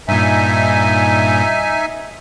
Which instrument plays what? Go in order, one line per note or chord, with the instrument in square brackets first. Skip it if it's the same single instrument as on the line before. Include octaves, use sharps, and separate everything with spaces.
[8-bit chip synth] G2 A#2 [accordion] D#4 E5 G#5